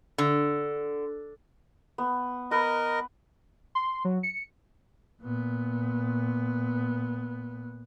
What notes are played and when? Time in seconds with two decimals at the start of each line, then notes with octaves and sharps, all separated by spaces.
0.18 D3
1.98 B3
2.51 A#4 B4 D#5
3.75 C6
4.05 F#3
4.23 C#7
5.21 A#2 B3